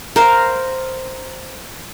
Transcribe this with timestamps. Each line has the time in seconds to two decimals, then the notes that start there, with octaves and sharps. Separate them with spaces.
0.16 A#4 C5 F5